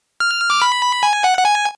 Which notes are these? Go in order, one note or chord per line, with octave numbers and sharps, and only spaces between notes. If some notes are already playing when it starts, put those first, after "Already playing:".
F6
D6
B5
G#5
F#5
F#5
G#5